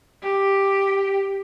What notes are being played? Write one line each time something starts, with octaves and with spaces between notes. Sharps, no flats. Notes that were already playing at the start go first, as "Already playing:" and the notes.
G4